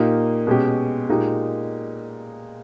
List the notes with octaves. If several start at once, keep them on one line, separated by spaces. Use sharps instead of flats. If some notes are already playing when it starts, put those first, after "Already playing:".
Already playing: A#2 A#3 D#4 G4
B2 G#3 C#4 G4
A#2 G#3 D#4 G4